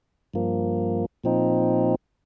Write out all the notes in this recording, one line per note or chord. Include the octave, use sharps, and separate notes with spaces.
G2 F3 A#3
A#2 F3 C4 D#4